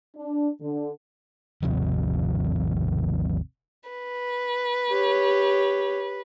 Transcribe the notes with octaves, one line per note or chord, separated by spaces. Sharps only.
D4
D3
G#1 D#2 C3 F3
B4
G4 C#5